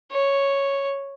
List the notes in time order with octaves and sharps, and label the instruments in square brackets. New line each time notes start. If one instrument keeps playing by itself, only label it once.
[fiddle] C#5